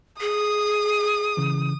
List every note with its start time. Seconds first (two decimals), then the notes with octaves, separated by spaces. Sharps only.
0.21 G#4 D#6
1.37 C#3 E3